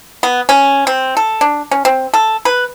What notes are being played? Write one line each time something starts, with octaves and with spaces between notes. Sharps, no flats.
B3
C#4
C4
A4
D4
C#4
C4
A4
B4